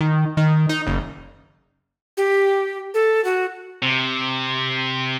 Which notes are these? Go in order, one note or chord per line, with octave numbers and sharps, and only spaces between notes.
D#3
D#3
D#4
F#1
G4
A4
F#4
C3